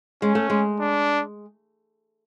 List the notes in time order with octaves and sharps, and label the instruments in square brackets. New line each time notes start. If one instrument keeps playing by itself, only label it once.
[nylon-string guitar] G#3 [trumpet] C#4
[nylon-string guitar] A3
G#3
[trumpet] D4